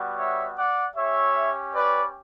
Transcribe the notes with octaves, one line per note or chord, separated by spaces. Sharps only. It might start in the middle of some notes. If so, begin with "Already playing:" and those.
Already playing: G3 B3 F#4
C#5 E5
D5 F#5
C#4 G4 C#5 E5
B4 D5